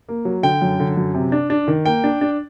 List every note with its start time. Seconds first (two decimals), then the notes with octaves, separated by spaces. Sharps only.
0.09 A#3
0.25 F#3
0.43 D3 G5
0.62 F#2
0.80 D3
0.97 F#2
1.14 C3
1.32 D4
1.50 D4
1.68 D#3
1.86 A#3 G5
2.04 D4
2.21 D4